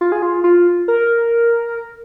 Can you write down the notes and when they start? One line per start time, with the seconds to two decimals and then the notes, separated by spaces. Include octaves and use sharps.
0.01 F4
0.12 G#4
0.22 F4
0.44 F4
0.88 A#4